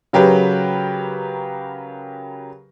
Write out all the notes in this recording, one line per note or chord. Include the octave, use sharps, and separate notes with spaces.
C#3 F#3 G4 A#4 B4